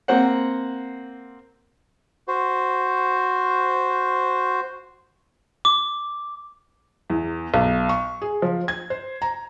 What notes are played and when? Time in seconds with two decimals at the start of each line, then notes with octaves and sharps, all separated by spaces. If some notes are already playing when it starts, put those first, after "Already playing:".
0.08 A#3 C4 C5 F#5
2.28 F#4 C5
5.65 D6
7.10 E2
7.54 B1
7.89 C#6
8.22 G#4
8.42 F3
8.68 G#6
8.90 C5
9.22 A#5